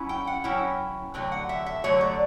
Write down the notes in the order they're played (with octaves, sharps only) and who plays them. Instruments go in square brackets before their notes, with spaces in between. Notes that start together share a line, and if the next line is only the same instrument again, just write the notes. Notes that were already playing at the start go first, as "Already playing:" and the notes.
Already playing: [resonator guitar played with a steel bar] F#3 C#4 E4
G5
F#5
F#3 C#4 E4 G5
D3 F#3 A3 G5
F#5
E5
E5
D3 F#3 A3 C#5
D5